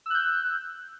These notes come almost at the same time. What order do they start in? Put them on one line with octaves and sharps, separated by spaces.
E6 F#6 G6